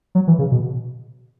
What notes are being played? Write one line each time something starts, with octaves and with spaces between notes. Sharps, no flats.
F#3
E3
C#3
B2